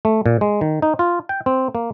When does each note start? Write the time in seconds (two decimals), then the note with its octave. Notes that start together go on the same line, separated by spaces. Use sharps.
0.05 A3
0.26 A#2
0.41 G#3
0.61 D#3
0.82 D#4
0.99 F4
1.29 G5
1.46 C4
1.75 A#3